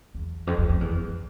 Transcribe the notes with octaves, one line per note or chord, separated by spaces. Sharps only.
E2
F2
F2
F2
E2
F2